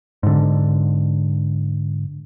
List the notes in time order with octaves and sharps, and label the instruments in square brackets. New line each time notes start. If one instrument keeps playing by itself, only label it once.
[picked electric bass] G#2 D3